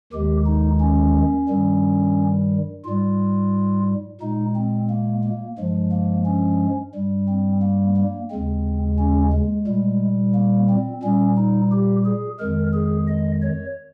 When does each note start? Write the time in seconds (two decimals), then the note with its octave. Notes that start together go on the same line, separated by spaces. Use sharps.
0.12 D#2 D#3 G#3 G4
0.46 D#4
0.80 C#4
1.49 G2 D#3 G3
2.84 G#2 G3 F4
4.21 A#2 G#3 D#4
4.56 C4
4.90 A#3
5.24 A#3
5.58 G2 F3 G#3
5.92 A#3
6.26 C#4
6.95 G2 G3
7.28 C4
7.62 A#3
7.96 A#3
8.31 D#2 C#3 G#3 C4
8.99 C#4
9.32 G#3
9.67 A#2 G3
10.35 A#3
10.69 C4
11.03 A#2 G3 C#4
11.37 D#4
11.72 G4
12.06 G#4
12.40 F2 D#3 G#3 A#4
12.74 G#4
13.08 D#5
13.42 C#5